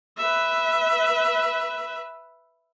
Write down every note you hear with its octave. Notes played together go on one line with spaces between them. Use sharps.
B4 E5